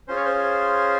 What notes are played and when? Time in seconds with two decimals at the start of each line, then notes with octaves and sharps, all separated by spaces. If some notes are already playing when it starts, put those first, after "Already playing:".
0.08 C#4 F4 G#4 C5
0.17 C#5
0.25 C5